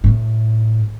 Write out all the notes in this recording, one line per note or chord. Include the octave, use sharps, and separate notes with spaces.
A2